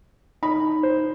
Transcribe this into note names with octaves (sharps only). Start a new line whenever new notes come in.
D#4 B5
C5